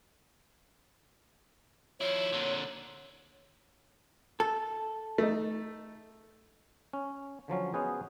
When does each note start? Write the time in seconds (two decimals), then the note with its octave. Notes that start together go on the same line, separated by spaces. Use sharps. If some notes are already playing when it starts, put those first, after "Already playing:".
2.01 F3 E4 C#5
2.32 A#2 D3
4.40 A4
5.18 A3 D#4
6.93 C#4
7.48 D3 F3 F#3 C#4
7.74 G#3 B3 C#4 F#4 G#4 C5